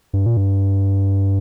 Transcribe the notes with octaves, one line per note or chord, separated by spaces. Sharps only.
G2
A#2
G2